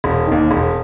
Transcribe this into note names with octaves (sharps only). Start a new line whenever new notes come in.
E1
D#2 D#3
E1